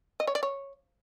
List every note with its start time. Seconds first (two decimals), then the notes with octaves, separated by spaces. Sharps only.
0.20 D#5
0.27 C#5
0.35 D5
0.43 C#5